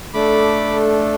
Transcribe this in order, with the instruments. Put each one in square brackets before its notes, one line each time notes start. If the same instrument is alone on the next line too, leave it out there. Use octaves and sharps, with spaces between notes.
[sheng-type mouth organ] A3 D4 A4 B5 D6